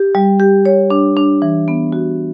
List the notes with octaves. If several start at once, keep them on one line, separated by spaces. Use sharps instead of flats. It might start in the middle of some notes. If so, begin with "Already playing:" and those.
Already playing: G4
G3
G4
C#5
D4
D4
E3
B3
F#4